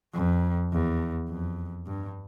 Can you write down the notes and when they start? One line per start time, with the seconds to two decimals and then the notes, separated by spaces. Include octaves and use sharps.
0.14 F2
0.72 E2
1.29 F2
1.87 G2